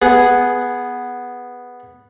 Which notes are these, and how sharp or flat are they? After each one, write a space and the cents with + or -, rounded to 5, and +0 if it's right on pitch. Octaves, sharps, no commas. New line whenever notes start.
B3 +0 G#4 +0